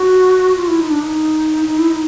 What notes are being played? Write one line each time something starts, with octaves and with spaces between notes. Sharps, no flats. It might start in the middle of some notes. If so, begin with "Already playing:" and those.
Already playing: F#4
F4
E4
D#4
D4
D#4
D#4
E4
D#4